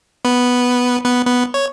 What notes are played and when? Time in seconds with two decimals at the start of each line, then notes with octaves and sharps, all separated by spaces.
0.25 B3 B4
1.05 B3 B4
1.25 B3 B4
1.54 C#5